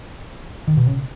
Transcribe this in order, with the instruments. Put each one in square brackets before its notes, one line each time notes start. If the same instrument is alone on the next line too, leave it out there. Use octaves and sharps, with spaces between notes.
[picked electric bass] D#3
B2
C#3